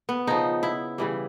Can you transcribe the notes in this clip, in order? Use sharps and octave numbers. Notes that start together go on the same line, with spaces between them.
B3
C#3 F3 D#4
E4
C#3 E3 G3